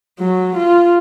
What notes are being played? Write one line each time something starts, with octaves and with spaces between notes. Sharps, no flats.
F#3
F4